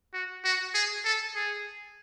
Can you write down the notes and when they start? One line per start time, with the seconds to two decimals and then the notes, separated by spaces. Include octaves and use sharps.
0.14 F#4
0.45 F#4
0.74 G#4
1.05 A4
1.35 G#4